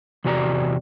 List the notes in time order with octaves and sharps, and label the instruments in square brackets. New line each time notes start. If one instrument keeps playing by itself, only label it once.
[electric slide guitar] E2 C3 F#4 G4 D5 A#5